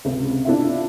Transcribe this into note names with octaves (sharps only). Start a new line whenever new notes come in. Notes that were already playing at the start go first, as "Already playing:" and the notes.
C#2 C3
D4 E4 F4 E5